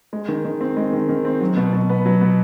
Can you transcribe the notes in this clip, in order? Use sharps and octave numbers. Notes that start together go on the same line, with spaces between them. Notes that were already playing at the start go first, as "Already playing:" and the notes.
G#3
D#3
D#3
C4
G#3
D#3
D#3
C4
F#3
B2
B2
B3
F#3
B2